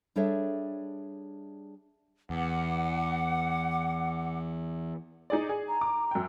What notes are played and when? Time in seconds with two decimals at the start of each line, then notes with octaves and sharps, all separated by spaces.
0.16 G3 D4 G#4 A4 C#5 E5
2.30 E2 F#5 D6
5.30 D#4 G#4 D5
5.49 G#4
5.68 A#5
5.81 D6
6.11 F#2 G5